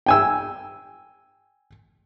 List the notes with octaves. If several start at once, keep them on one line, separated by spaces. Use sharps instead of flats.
G5 G#5 E6